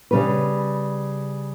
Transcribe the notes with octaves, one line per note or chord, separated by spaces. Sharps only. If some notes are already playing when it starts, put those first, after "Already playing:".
C#3 G3 B4